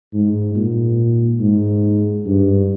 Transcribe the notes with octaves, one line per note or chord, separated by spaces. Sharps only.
G#2
A#2
G#2
G2